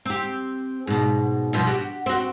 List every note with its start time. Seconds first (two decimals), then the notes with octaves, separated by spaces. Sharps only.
0.06 C4 G4
0.87 G#2 B2
1.53 G2 B2 F3
1.67 F#4 G4
2.06 C4 F#4